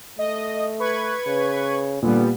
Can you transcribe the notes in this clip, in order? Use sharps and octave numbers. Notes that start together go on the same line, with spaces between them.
A3 D#5
B4 C#6 G#6
C#3
A#2 D3 G3 B3